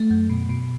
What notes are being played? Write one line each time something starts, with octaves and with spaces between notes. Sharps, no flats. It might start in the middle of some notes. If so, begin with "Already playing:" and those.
Already playing: A3
F#2
B2
B2